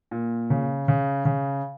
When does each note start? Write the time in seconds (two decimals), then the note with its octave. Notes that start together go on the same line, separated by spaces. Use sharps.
0.11 A#2
0.50 C#3
0.88 C#3
1.25 C#3